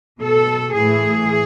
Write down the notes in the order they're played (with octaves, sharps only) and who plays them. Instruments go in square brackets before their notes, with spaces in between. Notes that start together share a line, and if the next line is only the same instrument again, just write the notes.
[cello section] B2 A4
A2 E3 G#4